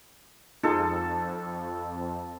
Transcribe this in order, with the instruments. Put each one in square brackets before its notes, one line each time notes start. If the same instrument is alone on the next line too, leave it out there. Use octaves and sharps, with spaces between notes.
[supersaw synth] F2 [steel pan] D#4 F4 G#4 [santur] A4